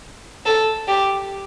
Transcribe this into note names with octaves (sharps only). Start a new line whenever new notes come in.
A4
G4